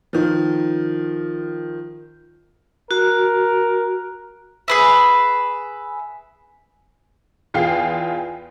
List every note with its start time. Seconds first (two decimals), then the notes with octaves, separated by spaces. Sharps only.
0.13 D#3 F3
2.91 F#4 A#4
4.68 G#4 B4 E5
7.54 E2 F4 G#4 G5 C7